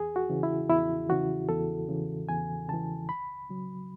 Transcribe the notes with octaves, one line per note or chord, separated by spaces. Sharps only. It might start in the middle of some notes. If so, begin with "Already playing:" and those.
Already playing: E2 G#4
F#4
C#3 E3
E4
E2 E4
C#3 E3 F#4
E2 A4
C#3 E3
E2 G#5
C#3 E3 A5
C#2 B5
C#3 F#3